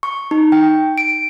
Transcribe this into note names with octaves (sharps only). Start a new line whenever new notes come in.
C#6
D#4
G5
D7